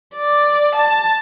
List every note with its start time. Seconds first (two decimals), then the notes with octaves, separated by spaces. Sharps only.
0.15 D5
0.75 A5